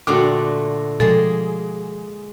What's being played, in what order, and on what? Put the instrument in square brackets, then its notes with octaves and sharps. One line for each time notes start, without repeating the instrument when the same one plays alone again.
[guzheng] A#2 D3 A3 [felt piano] F#4 D6
[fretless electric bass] B2 F3 [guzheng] G#3 A#3 G#4 [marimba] A4